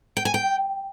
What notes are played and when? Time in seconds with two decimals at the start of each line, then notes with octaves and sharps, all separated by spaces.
0.17 G5
0.25 G#5
0.34 G5